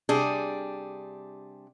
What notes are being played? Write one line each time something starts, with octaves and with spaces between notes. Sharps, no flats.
C3 G3 D4 G#4